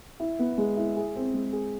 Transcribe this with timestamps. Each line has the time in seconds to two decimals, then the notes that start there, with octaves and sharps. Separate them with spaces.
0.20 E4
0.39 B3
0.58 G#3
0.77 E4
0.96 G#4
1.16 C4
1.34 G#3
1.53 G#4